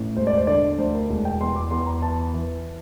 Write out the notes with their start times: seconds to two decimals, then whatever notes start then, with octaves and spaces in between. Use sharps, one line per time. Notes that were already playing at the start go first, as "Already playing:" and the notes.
Already playing: A1
0.17 E1 C5
0.27 D5
0.37 C5
0.47 D3 D5
0.78 D2 C5
0.94 A#4
1.09 E1
1.25 G5
1.41 E2 C6
1.56 D6
1.71 E2 C6
1.86 A#5
2.02 E3 A5
2.33 E3